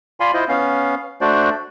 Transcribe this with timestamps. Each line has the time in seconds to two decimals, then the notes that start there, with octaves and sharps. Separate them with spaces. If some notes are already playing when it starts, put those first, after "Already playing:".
0.20 F4 D5 F5 G#5 B5 C6
0.34 E4 F4 C5 D#5
0.49 B3 C#4 F5
1.21 A3 D4 F#4 C5 D5